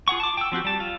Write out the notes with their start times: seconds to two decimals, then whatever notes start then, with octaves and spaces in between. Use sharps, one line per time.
0.08 F4 G#4 F#5 C#6
0.20 A5 D6
0.37 G5 E6
0.52 F3 C4 F#4 G4
0.64 G3 A5
0.80 F4